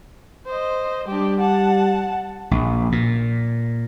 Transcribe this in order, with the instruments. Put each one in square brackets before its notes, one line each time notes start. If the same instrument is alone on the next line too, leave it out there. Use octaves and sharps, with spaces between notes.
[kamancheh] C5 D#5
[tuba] G3 [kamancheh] D4 G4
[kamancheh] F#5 A5
[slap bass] A#1
A#2